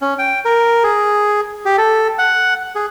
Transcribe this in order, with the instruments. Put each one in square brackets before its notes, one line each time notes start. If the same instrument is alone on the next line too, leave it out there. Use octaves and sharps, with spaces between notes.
[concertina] C#4
G5
A#4
G#4
G4
A4
F#5
G#4